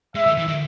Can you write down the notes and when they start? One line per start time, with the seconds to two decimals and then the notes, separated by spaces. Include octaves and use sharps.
0.15 G#3 E5
0.27 D#3
0.37 E3
0.48 D#3